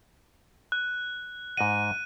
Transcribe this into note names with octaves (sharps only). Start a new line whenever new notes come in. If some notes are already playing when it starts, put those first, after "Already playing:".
F#6
G#2 D#5 F#5 D#7